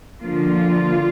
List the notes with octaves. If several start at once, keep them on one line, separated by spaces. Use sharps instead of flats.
D3 F3 A#3 F4